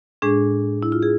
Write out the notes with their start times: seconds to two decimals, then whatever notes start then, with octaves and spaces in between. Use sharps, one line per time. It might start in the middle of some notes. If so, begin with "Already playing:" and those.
0.22 A2 G#3 D4 G#4
0.83 E4
0.92 F4
1.03 G#4